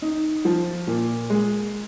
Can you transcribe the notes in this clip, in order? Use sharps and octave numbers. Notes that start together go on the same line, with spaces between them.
D#4
F3
A#2
G#3